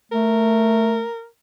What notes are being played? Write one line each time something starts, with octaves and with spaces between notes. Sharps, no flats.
A3 A#4